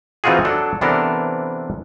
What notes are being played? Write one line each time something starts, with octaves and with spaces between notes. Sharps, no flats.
E3 C4 D#4 F4 F#4 G#4
F#3 D4 A4
C3 E3 B3 D4 A4 A#4